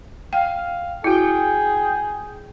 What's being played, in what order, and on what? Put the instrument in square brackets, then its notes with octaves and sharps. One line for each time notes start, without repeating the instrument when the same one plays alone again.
[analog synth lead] F5 [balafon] G5
[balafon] E4 F#4 [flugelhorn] G#4 [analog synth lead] G5